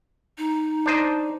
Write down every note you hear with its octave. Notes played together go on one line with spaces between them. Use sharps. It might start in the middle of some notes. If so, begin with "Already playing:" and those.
D#4
D4 C5 D#5